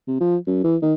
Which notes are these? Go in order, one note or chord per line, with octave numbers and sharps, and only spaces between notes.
C3
F3
F#2
E3
D#3